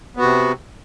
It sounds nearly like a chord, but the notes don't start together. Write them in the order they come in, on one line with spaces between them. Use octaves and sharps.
B3 F#4 C3